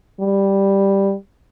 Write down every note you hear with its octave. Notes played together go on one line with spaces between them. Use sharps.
G3